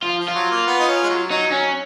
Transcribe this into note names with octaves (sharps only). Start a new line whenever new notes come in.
F3 F4
F3
F4
F#3
A#3
B3
D#4
C#4
G#3
F#3
F#3 D#4
F#3 C#4